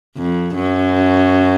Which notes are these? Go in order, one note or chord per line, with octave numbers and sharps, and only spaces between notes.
F2
F#2